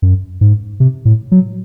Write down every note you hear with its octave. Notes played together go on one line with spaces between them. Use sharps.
F#2
G#2
C3
A2
F#3